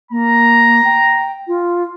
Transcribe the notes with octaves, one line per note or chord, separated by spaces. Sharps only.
A#3 A#5
G5
F4